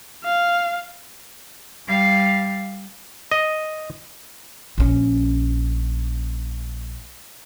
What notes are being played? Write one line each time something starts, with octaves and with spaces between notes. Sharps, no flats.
F5
G3 F5
D#5
A#1 C#4